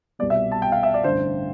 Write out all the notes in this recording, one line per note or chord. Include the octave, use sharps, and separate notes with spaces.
C2 B2 G3 B3 D5
E5
A5
G5
F5
E5
D5
A1 G2 D3 C5